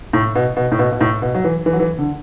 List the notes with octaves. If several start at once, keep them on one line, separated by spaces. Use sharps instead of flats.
A2
B2
B2
A2
B2
B2
A2
B2
F#3
E3
E3
F#3
E3
D3